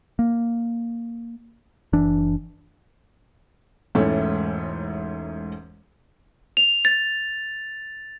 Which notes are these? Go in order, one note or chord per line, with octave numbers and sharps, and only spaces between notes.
A#3
F#1 E3 D4
E1 G#2 A3 C#4 E4
F7
A6